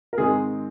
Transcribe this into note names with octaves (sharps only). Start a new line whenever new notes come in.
A#4
G#2 D#3 G#3 C4 G#4